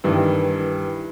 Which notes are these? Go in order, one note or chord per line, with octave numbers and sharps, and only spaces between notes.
G2 D#3 E3